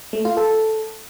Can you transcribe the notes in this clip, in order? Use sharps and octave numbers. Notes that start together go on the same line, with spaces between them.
A3
F4
A4